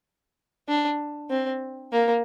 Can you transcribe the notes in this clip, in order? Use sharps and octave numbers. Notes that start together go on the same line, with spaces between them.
D4
C4
A#3